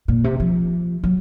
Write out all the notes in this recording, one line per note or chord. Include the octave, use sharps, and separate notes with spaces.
A#2
C3
F3
F#3